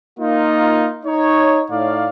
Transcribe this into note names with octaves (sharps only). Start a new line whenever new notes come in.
A#3 D#4 F4
D#4 C#5
A2 D#4 C#5 D5 F5